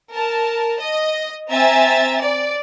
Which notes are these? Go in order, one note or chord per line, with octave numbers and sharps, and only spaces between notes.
A#4 A5
D#5
C4 E5 G#5 A#5 A6
D5